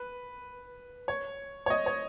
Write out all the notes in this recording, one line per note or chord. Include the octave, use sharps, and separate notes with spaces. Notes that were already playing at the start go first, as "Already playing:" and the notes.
Already playing: B4
C#5
C#5
D#5
C#5